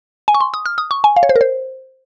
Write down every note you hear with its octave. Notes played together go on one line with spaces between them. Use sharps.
G#5
C#6
C6
D#6
F6
D#6
C#6
G#5
F5
C#5
C5
A#4
C5